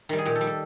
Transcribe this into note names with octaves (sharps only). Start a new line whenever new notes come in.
D#3 G3
G#4
A#2 G4
A4
G3
A4